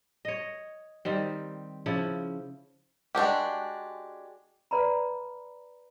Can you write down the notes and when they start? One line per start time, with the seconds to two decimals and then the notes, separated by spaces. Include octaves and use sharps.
0.25 C#5 D#5
1.05 D#3 G3 C4
1.86 C#3 F3 E4
3.15 G#3 D4 F#4 G4
4.71 B4 D5 A#5 B5